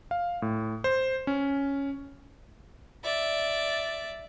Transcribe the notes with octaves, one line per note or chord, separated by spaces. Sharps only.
F5
A2
C5
C#4
D5 E5